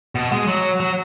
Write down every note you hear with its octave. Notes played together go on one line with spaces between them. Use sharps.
B2
G#3
F#3
F#3